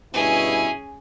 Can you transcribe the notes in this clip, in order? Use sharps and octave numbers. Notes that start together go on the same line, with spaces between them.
G2 B2 C#4 E4 G#4